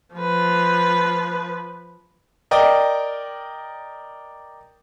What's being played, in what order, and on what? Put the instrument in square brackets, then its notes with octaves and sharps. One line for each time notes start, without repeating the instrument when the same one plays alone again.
[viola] F3 B4
[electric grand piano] A#4 D5 D#5 G5